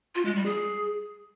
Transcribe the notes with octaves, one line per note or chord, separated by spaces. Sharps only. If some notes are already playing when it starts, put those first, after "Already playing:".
F4
G#3
G3
G#4